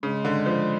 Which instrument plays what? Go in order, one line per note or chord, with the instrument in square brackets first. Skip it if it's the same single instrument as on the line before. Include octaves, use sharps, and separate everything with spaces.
[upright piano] C#3 [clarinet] G#3
[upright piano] D3
F3